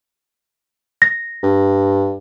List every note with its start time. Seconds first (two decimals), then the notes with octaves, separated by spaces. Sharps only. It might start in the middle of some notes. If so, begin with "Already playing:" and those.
1.02 A#6
1.43 G2